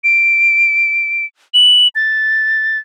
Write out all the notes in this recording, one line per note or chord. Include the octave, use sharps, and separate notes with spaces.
D7
F#7
A6